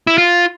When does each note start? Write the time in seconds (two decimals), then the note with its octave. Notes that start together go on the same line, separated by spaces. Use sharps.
0.07 E4
0.18 F4